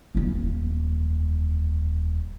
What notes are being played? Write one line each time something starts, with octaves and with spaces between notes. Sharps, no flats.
D#1 F2